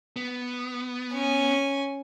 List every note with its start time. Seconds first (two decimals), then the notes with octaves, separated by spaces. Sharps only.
0.16 B3
1.13 C#4 G#5